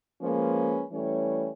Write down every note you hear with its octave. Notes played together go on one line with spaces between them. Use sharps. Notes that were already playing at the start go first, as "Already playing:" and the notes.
F3 G#3 A#3 C#4 B4
E3 G3 A3 C#4 C#5